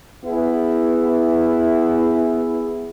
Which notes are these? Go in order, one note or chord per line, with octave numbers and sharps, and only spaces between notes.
B3 E4 G#4